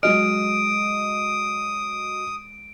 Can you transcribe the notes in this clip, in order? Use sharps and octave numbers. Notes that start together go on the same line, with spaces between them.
F#3 G#3 D#5 D#6 F6 D7